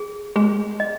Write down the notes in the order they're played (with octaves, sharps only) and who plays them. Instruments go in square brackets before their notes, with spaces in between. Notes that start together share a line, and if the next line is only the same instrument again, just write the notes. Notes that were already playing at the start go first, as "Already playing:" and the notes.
Already playing: [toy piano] G#4
[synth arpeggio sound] G#3 [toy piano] G#4
[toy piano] D#5